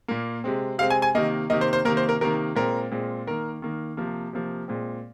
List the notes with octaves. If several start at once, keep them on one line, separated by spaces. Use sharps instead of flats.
A#2 A#3
C3 G#3 C4
C3 G#3 C4 F5
G#5
G#5
C3 D#3 A#3 D#5
C3 D#3 A#3 D#5
C5
C5
C3 D#3 A#3 A#4
C5
A#4
C3 D#3 A#3 A#4
A#2 G#3 C4 A#4
A#2 G#3 C4
D#3 A#3 A#4
D#3 A#3
C3 F3 A#3
C3 F3 A#3
A#2 G#3 C4